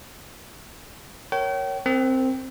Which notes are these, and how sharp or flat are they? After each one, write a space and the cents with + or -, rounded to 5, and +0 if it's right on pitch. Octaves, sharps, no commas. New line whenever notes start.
A#4 +0 C#5 +0 G5 -40
C4 +0 A#4 -25